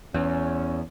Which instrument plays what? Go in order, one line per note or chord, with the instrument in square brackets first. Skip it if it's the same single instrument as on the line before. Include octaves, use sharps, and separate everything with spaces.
[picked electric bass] E2 [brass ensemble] C#4